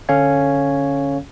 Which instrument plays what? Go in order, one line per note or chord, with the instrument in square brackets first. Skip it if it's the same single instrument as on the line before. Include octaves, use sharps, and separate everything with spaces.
[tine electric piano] D3 C#4 A4 C#5 F5 G#6